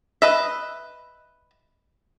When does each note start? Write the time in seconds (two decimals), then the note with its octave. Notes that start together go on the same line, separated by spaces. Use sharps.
0.22 B4 D#5 E5